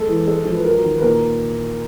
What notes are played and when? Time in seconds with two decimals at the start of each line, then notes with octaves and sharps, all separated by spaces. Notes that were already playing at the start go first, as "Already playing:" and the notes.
Already playing: G#3 A4
0.08 E3
0.28 G#3 A4
0.45 F3
0.54 B4
0.64 F#3 A#4
0.84 D#3
0.98 B4
1.02 A#2 A#4